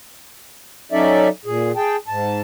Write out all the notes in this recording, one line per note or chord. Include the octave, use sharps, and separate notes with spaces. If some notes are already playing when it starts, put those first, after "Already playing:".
F#3 C#4 D#4 A4 D5 E5
A#2 G#4
G#4 G5 A5
G#2 A5